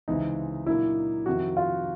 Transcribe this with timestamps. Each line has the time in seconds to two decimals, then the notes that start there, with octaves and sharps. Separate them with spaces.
0.08 C#2 C3 E3 G#3 C4 D#4
0.66 A#2 F#3 A#3 D4 E4
1.26 F2 C3 D#3 F#4
1.57 F4